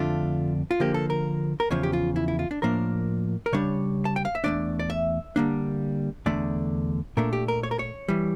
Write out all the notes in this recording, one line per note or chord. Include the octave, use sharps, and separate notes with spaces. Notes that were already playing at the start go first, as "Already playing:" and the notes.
Already playing: F2 D3 A3 D4 F4
F4
D3 F3 A#3 G4
A4
A#4
A#4
E2 C#3 F3 C#5
G4
F4
E4
E4
F4
D4
A2 F3 A#3 D4 A#4
A#4
C#3 G3 D4 C#5
A5
G5
F5
E5
E2 E3 A3 D4 D5
D5
E5
D3 G3 A#3 D4
E2 D3 A3 D5
A#2 A3 D4 A#4
G4
A#4
C#5
A#4
C#5
E3 G3